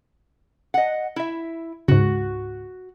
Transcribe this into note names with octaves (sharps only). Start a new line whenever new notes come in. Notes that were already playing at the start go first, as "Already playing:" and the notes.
D#5 F#5
E4 E5
C#2 G#2 F#4